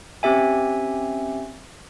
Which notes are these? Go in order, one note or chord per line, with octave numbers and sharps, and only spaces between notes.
C4 C#4 G4 E5 G#5